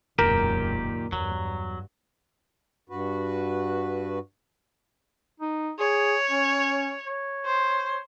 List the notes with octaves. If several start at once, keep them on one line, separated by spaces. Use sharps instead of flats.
E1 C#2 F#2 A#2 D#3 G4 A#4
E2 G2 F#3
G2 F#4 B4
D#4
G#4 C#5
C#4
C#5
C5